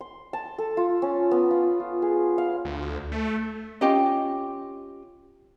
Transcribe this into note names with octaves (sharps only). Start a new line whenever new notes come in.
C6
A5
A4
F4
C#4
B3
F4
F4
G#4
F5
D2
A3
C#4 F4 G4 D#5